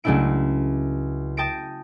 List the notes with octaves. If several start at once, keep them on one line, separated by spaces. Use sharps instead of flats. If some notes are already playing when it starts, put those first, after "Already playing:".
C#2 F#3 A3 D4 E4 D7
G5 A5 D#6 A#6 D7